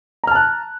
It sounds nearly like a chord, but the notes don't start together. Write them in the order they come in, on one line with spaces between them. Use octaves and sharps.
A#5 F6 A5 F#6